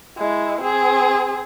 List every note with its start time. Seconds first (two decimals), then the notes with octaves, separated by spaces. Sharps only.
0.17 G#3 E4
0.61 C4 G#4